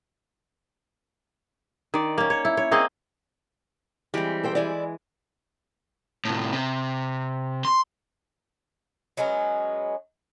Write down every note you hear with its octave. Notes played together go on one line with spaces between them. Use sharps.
D#3 D5
A#3 C#4
C#5
E4
C#5
A#3 C4 G#4 D#5
E3 G3 G#3 C4
A4 C5 G5
E3 G#3 E4 D5 G#5
A2 C3
C3
C6
F#3 G#3 B3 C#4